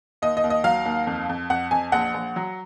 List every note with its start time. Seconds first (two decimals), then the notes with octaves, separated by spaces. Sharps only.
0.22 D#2 D#5
0.37 D#5
0.44 D#2
0.50 D#5
0.64 F#3 F5
0.85 D#2
1.07 F2
1.29 F2
1.50 F2 F#5
1.71 F2 G#5
1.92 A#1 F#5
2.14 A#1
2.36 F#3